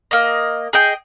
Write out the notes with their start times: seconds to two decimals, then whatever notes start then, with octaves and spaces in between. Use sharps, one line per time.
0.11 A#3 D#5
0.73 G#4 D#5 G5